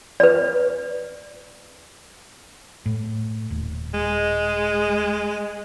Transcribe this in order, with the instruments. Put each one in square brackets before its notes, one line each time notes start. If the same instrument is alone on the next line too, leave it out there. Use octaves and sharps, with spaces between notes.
[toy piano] B4 D5
[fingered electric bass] A2
D#1
[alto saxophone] G#3